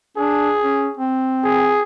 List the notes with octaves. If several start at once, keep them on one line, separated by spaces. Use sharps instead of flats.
D4 G#4
C#4
C4
G#4